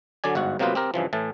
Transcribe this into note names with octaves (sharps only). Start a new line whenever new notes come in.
D3 F#3 D5 G#5
G1 G#2 F#4 F#5
C3 F#3 A#3 B3 F4 B4
C4 G4 A#4
G2 C#3 E3 F3
A2 E3 A5